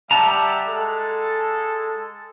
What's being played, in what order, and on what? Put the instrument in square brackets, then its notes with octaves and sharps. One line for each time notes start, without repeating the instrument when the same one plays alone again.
[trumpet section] G3 G4 E5 [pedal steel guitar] F#5 A5 A#5
[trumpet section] G#3 A4